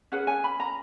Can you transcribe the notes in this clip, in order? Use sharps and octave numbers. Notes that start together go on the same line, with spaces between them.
C#4 G#4 B4 F#5
G#5
B5
A#5